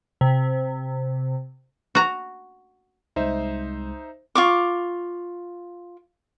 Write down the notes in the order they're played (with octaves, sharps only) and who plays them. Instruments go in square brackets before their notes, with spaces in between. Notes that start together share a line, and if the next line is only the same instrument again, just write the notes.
[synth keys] C3
[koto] F#4 A#5
[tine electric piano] C2 G#3 [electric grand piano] D#4 C5 E5
[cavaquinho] F4 C#6 D6